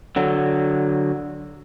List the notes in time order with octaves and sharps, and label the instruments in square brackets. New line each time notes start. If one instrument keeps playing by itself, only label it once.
[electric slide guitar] D3 F#3